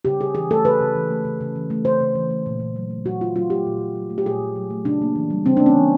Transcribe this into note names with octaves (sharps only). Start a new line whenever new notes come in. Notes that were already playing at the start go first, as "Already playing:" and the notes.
C#3 G4
C#3 G#4
E3 G#4
A3 A4
C#3 B4
C#3
E3
A3
C#3
C#3
E3
A3
C#3 C5
C#3
E3
A3
A#2
A#2
F#3
A3
A#2 F#4
A#2 F4
F#3 F4
A3 G4
A#2
A#2
F#3
A3
G4
A#2 G#4
A#2
F#3
A3
C#3 D4
A#3
E3
G3
C#3 C4
A#3 D4
C#4
E3